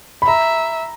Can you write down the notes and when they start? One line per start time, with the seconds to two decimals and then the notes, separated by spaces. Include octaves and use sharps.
0.22 B5
0.27 E5 A#5